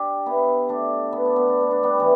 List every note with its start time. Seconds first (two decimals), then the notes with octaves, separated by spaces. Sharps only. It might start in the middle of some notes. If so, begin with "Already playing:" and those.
Already playing: D4 G4 A4
0.26 B3 E4
0.69 A3 D4
1.12 B3
1.25 D4
1.36 B3
1.49 D4
1.60 B3
1.71 D4
1.83 G3 B3
2.00 E3